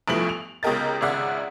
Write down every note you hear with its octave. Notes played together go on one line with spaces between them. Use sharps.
A1 G2 E3 F3 A3 F#7
F7
C#2 C#3 G4 A#4 D#5 A6
G#1 C#2 C#3 D5 E5 F#5